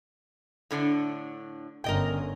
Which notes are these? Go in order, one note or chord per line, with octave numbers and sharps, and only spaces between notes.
A2 D3 D4
G1 D3 C#4 A#4 D#5 G5